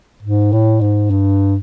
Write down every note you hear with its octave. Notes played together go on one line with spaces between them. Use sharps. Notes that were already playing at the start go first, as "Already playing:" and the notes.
G#2
A2
G#2
G2